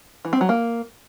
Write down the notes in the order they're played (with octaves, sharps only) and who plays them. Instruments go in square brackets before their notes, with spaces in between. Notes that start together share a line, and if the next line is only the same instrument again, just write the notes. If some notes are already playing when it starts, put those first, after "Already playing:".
[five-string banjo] E3
C4
F#3
A#3